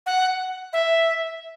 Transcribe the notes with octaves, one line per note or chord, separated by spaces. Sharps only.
F#5
E5